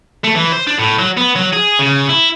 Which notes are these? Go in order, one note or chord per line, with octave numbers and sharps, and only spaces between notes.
A3
E3
C5
D4
A2
F#3
B3
F#3
G#4
C#3
E4